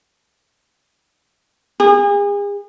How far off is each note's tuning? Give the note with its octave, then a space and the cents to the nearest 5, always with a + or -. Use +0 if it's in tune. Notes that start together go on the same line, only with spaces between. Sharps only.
G#4 -40